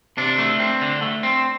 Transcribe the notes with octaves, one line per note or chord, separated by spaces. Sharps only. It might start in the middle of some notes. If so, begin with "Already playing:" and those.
C3 D4
A3
C4
D3
A3
C4